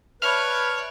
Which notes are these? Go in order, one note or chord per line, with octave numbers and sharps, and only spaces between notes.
B4 C#5 D5 E5 A5 B5 F6